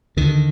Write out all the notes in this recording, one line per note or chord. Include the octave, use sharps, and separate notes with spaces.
D#2 D3 D#3